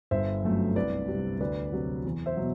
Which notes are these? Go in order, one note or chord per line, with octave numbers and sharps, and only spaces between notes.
G1 C5 E5
F#2 F#3 A3 C4
C2 B4 D5
C3 G3
D2 B4 D5
C3 F#3
E2
C5 E5
B2 F#3